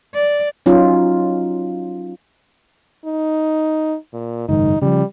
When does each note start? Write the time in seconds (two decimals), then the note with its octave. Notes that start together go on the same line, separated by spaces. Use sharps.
0.15 D5
0.66 F#3 C#4 D#4 F4
3.05 D#4
4.13 A#2
4.49 F#1 G#2 D#3 D#4
4.82 C#3 F3 G3